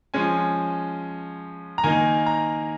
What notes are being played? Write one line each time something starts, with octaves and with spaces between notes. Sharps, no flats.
F3 G#3 C#4 G#5
A#5
D#3 A#3 D#4 G#5
A#5